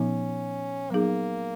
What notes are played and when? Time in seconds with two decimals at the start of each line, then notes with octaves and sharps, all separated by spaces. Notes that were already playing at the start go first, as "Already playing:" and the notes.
Already playing: A#2 F3 B3 C#4 D#4
0.90 F#3 A#3 B3 D#4 G#4